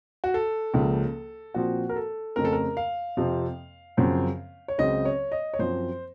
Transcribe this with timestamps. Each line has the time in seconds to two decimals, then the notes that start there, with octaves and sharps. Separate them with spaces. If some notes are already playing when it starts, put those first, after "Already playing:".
0.24 F#4
0.34 A4
0.74 C#2 C#3 F3 A#3
1.54 A#2 F3 C4 F#4
1.89 A#4
1.96 A4
2.36 F2 C#3 A3 C4 A#4
2.45 A4
2.52 A#4
2.77 F5
3.17 F2 C3 F3 C4
3.97 F#2 C#3 F3 C4
4.68 C#5
4.78 C#2 C#3 F#3 C4 D#5
5.05 C#5
5.32 D#5
5.54 C#5
5.59 F#2 F3 C4 C5